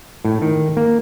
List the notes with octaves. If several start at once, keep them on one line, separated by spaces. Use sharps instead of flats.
A2
D#3
A#3